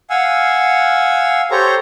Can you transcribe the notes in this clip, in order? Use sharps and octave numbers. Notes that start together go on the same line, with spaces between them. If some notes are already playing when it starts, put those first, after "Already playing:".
F5 F#5 G#5 E6
G4 A4 C5 C#5 A#5